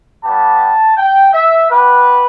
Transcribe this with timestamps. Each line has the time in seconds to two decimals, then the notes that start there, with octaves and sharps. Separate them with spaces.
0.23 G3 B3 G4 A5
0.97 G5
1.33 E5
1.70 B3 G4 B4